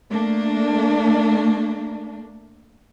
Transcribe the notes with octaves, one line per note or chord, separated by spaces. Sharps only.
A3 A#3 D4